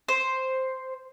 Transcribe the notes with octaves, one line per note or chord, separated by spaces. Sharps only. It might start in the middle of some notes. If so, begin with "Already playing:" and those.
C5